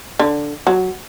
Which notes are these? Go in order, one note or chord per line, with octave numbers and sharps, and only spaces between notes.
D3
F#3